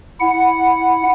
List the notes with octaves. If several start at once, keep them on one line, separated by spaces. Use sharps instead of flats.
E4 F#5